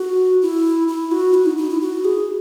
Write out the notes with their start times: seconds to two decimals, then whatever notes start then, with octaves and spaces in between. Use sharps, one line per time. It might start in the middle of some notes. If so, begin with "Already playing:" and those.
Already playing: F#4
0.42 E4
0.88 E4
1.11 F#4
1.34 E4
1.45 D#4
1.57 D#4
1.70 E4
1.81 F#4
2.05 G#4